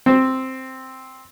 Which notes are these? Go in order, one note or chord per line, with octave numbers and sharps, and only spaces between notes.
C4